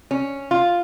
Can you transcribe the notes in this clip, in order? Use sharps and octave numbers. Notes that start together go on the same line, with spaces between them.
C#4
F4